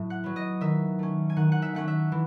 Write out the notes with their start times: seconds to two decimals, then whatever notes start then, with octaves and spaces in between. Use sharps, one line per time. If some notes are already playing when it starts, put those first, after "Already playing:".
Already playing: A2 F#3 E5
0.10 F#5
0.24 F#3 B3
0.36 D#5
0.61 D#3 E5
0.99 A3 C#4
1.30 G#5
1.36 D#3 F#5
1.52 F#5
1.62 E5
1.75 A3 C#4 F#5
1.88 E5
2.12 E3